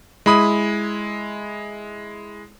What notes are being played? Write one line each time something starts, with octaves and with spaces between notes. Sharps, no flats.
G#3 E4 B5 D#6